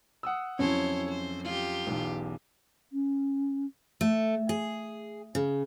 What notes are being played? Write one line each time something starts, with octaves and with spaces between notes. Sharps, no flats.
F#5 D#6 E6
F2 F#3 C#4 E4 C5 C#5
C5
F4 G4
B1 E2
C#4
A3
G#4
C#3